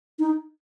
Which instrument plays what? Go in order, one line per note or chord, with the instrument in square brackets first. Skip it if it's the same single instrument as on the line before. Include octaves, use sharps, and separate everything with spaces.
[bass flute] D#4